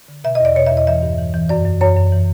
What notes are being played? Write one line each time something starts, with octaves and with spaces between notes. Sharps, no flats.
D3
B2 E5
D#5
E2 D5
B2 C#5
E5
E2
D#5
E3 E5
G2
E3
E3
F#2 D5
F#2
F#2 C#5
F#2
E3